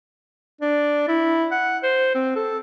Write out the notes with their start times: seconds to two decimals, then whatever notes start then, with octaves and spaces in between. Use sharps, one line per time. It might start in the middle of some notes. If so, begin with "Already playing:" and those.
0.61 D4
1.08 E4
1.51 F#5
1.83 C5
2.15 C4
2.36 A4